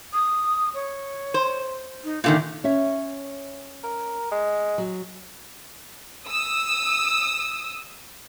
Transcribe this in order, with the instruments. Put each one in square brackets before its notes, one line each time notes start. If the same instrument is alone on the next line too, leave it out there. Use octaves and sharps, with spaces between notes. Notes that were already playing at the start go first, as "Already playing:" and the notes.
[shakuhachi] D#6
C#5
[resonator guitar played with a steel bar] C5
[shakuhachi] D#4
[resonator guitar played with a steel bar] A#2 D3 D#3 [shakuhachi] E5
[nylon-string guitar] C#4 C#5 E5
[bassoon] A#4
G#3
[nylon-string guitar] F#3
[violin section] D#6 E6